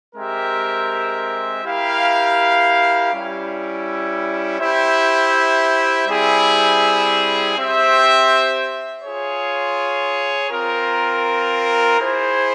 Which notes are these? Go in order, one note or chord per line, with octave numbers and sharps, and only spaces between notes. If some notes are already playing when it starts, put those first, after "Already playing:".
G#3 C4 G4 A#4 E5
E4 G4 A#4 F5
G3 C#4 E4
E4 G4 C5 E5
G3 C4 E4 G#4 E5
C4 G4 C5 E5
F4 G#4 C#5
C4 F4 A#4
E4 G#4 C5